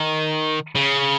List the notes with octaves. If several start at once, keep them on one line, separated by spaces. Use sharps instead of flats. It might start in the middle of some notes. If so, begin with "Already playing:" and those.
Already playing: D#3
C#3